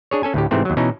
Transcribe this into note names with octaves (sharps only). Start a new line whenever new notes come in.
D4 G#4 C#5
C#4 A4 G#5
D2 A2 G4
G#2 C3 E3 A3 C4
D#2 F#3
B2 E3 C#4 D#4